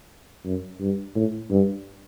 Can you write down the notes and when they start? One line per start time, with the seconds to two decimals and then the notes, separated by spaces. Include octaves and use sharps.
0.45 F#2
0.80 G2
1.15 A2
1.51 G2